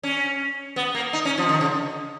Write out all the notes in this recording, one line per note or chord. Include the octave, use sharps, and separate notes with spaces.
C#4
B3
A#3
D#4
C#4
F3
D#3
C#3